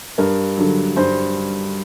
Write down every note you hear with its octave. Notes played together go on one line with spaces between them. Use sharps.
G2 A#4
D3 F#3
G2 C5